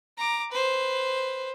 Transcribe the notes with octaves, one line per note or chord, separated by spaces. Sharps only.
A#5 D6
B4 C5